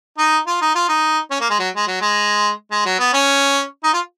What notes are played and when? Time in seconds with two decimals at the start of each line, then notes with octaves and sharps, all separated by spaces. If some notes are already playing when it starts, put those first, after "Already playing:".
0.18 D#4
0.47 F4
0.61 D#4
0.75 F4
0.89 D#4
1.31 C#4
1.40 A#3
1.50 G#3
1.59 F#3
1.76 G#3
1.87 F#3
2.01 G#3
2.71 G#3
2.85 F#3
2.99 B3
3.13 C#4
3.84 D#4
3.93 F4